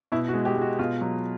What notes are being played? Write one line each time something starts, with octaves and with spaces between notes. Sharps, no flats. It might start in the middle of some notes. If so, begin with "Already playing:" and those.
B2 E4
F#4
G#3
G4
G#3
F#4
B2 F4
F#3